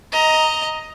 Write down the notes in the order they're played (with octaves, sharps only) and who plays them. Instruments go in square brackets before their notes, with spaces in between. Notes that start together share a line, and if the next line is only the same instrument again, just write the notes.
[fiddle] D#5 A#5